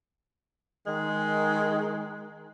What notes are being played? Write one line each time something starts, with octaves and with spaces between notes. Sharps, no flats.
D#3 G#3